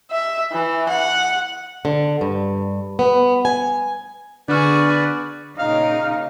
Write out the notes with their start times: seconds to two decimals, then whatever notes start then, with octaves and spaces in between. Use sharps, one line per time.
0.11 E5
0.52 E3
0.89 F#5
1.85 D3
2.21 G2
2.99 B3
3.45 G#5
4.48 D3 B3 D4 F#4 G#4 B4 D5 F6
5.59 A#2 C#3 D#4 F5